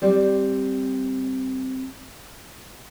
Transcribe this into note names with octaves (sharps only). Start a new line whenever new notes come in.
G3 C4 D5